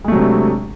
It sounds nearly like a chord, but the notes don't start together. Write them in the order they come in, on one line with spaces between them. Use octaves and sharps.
G#3 A3 F#3 C3 D4